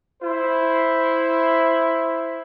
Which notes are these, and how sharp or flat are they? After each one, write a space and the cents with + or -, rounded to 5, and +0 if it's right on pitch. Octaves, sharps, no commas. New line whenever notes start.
E4 +0 C5 +0